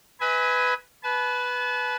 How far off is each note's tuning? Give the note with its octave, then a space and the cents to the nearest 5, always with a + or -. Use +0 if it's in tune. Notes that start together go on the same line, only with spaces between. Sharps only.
B4 +10 E5 -45 G#5 +0
B4 +0 A5 -40